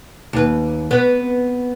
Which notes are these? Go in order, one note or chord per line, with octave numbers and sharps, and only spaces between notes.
D#2 B4
B3